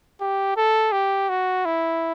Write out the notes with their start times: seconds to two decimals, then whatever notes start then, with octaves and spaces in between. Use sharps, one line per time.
0.21 G4
0.57 A4
0.92 G4
1.29 F#4
1.65 E4